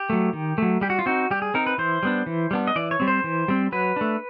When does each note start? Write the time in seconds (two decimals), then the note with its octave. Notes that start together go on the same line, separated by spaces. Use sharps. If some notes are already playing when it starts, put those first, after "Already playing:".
Already playing: G4
0.10 F#3 A3
0.33 D#3
0.58 F#3 A3
0.81 G3 G4
0.90 F#4
0.99 F4
1.06 C4 D#4 F#4
1.31 G3 G4
1.42 G#4
1.54 C4 D#4 A#4
1.67 B4
1.78 E3 C5
2.03 G3 B3 D4
2.26 E3
2.51 G3 B3 D4
2.67 D#5
2.76 E3 D5
2.91 C#5
3.00 G3 C4
3.08 C5
3.24 E3
3.48 G3 C4
3.72 F#3 B4
3.96 A3 D4